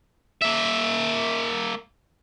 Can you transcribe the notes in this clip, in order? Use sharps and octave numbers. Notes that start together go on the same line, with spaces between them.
A#3 E5